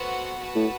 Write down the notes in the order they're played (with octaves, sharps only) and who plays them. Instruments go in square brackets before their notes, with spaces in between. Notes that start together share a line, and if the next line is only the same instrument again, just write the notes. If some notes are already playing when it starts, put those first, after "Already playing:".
Already playing: [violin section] B3 F#4 A4 C5 F#5
F#4 B4 F#5 A5
[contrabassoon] A2